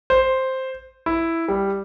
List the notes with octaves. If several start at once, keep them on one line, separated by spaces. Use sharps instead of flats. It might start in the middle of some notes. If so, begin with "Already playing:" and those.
C5
E4
G3